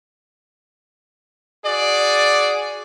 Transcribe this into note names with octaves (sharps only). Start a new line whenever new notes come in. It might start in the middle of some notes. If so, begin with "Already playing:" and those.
F#4 G#4 D5